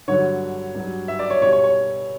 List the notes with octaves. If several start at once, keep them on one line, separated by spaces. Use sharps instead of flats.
G2 D3 F#3 C#5
G2 F#3
E5
D5
C#5
B2 G3 C#5
C#5
C#5